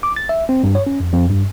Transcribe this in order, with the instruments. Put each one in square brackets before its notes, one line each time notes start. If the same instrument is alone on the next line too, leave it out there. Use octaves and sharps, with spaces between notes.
[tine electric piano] D6
A6
E5
C4
G2
C#5
C#4
F2
F2
G2